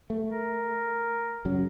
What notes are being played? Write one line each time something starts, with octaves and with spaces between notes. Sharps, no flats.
A3
A#4
F#2 C#3 F#3